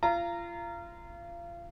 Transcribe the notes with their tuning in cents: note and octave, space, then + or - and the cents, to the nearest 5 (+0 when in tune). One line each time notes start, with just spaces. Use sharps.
F4 -30 A#5 -15